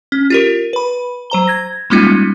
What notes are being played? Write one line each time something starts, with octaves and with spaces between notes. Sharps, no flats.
C#4
F4 G4 A#4
B4 B5
F#3 C5 A#5 G7
G#6 A#6
G3 G#3 A#3 C#4 D#4 F4